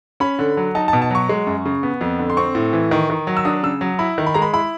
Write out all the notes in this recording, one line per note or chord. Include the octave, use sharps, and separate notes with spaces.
C#4 B5
D3
F#3
D#4 A5
A5
B2
A5
F#3 C#6
G#3
F#2
C#3
B3
F2
D3
C6
C4 C#6
A2
E3
D#3
D#3
F#3
E6
D4 D#6
C#3 E6
F#3
E4 B5
D#3
B5
G#3 A#5
B5
E4 B5